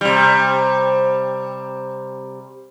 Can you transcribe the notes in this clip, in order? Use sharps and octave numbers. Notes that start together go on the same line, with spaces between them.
C3 G3